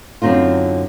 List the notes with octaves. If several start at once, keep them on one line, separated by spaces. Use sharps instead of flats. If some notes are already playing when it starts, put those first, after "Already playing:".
F#2 D3 C4 D#4 F4